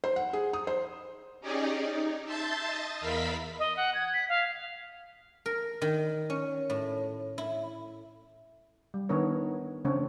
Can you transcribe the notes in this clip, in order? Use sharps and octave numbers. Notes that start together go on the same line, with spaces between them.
C5
F#5
G#4
D#6
C5
C#4 D#4 G4 G#4 D5 D#5
D#4
E5 A5 C6 G6 A6
D#5
E2 A#4 E5 F5 B5 B6
D#5
F#5
G#6
B6
F5
A#4
D#3
C#4
A2
E4
G3
D#3 B3 D4 A#4 C#5
C#3 E3 A3 C4 D4 C#5